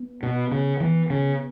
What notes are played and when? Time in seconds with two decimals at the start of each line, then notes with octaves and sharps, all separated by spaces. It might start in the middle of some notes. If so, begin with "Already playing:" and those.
Already playing: B3
0.23 B2
0.51 C#3
0.80 E3
1.10 C#3